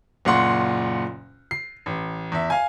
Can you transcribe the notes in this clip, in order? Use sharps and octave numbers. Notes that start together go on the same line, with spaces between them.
F#1 A#2 F4 F#5 C6 C#6
C7
A1
E2 E5
F5 G#5